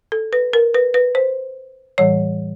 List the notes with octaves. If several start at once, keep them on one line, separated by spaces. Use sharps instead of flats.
A4
B4
A#4
B4
B4
C5
A2 E3 G3 C#5